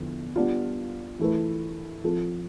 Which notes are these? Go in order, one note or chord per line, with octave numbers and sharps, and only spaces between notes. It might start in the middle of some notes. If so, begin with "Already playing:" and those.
Already playing: E2 D3 F3 B3
G3 B3 D4 F4
E3 A3 E4 B4
F3 C4 F4 A4